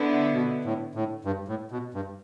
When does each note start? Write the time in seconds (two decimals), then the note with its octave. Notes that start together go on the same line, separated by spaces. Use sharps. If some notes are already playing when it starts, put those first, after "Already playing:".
Already playing: D3 B3 E4
0.34 B2
0.65 A2
0.95 A2
1.25 G2
1.48 A2
1.71 B2
1.94 G2